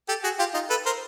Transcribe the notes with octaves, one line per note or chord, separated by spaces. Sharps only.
G4 A4
F#4 G#4
F4 G4
D#4 F4
A4 B4
A#4 C5